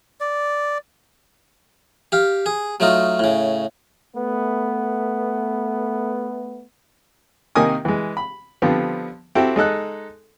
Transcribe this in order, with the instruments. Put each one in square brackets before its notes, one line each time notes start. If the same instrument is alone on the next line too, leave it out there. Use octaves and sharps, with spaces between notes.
[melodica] D5
[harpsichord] G4 F5
G#4
F#3 A3 D#4 F4
A2 C#3
[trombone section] A3 B3
[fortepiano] C3 D#3 A#3 D#4 G#5 D#6
E3 G#3
B5
D3 F3 G3 B3 C4
C4 E4 F#4 G4 A4
G#3 D#4 A4 F#6